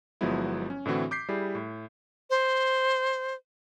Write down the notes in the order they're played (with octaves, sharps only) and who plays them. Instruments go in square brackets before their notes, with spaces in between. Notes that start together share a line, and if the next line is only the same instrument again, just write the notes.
[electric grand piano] G1 F3 F#3 G#3 B3 E4
C#4
A2 D3 E3 C4 F#4
D6 G6 B6 C7
G3 E4 G4 G#4
A2
[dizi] C5